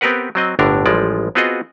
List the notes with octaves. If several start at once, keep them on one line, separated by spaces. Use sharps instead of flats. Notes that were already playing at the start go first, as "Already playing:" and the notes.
B3 C4 G4 A#4 B4 F#5
F#3 C4 D#5
G1 A2 D3 D4 A#4
A1 F3 G3 G#3 D5
B3 C4 F4 F#4 G#4 D#5